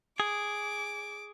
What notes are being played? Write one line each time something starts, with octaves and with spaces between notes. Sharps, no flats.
G#4 D6